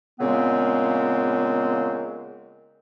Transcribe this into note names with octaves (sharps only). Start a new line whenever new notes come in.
A#2 C#3 G#3 B3 C4